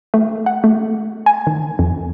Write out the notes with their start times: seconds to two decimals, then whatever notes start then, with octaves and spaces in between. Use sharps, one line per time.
0.14 A3
0.46 F#5
0.64 A3
1.26 G#5
1.47 D#3
1.79 F2